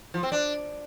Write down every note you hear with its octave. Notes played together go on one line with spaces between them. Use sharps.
F3
C4
D4